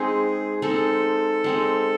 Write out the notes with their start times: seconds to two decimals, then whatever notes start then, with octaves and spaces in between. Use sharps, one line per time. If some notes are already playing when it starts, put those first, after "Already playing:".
Already playing: G#3 C4 D#4 G#4
0.62 G#3 C4 D#4 A4
1.44 G#3 C4 D#4